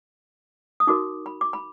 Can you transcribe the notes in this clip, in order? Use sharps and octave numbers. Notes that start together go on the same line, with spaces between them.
D#6
D#4 F#4 A#4 D6
B5
D6
B5